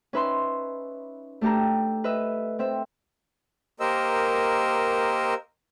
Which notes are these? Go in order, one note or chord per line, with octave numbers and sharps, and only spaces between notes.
C#4 D#4 B4 E5 B5 C6
A3 D4 G4 A4 A#5
B4 D#5 E5
C4 E5
A#3 G4 A#4 C5 D#5 E6